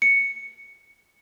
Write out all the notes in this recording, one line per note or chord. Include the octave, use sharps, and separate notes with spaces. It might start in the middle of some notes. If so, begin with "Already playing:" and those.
C#7